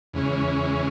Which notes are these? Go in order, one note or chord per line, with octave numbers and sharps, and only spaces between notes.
E2 C#3 E3 G#3 C#4